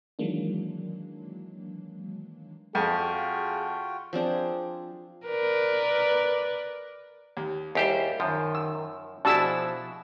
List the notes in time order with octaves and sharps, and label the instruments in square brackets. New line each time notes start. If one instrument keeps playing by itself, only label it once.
[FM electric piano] D#3 E3 F#3 G#3 A#3 D4
[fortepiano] F2 [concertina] F4 F#4 G5 [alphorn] G#4
[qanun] F3 C4 D4 G#4
[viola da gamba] A#4 B4 D5
[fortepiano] D#2
[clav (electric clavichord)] D#2 G4 C5 [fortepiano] G3 E4 G#4
[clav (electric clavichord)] F#2 F3 [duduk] D#3
[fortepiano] E6
[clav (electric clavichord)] B2 E4 [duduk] F3 [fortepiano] D4 F#4 G#4 [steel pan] A5 E6